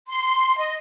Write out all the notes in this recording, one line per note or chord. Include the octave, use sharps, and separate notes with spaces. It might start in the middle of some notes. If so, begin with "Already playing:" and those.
C6
D#5